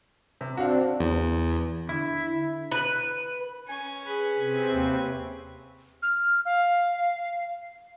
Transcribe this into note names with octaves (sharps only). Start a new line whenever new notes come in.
C3
C4 D4 F#4 F5
E2
D3 E4
B4
C#4 G#5 C#6
G#4 B4
C3 C4
D#2
F6
F5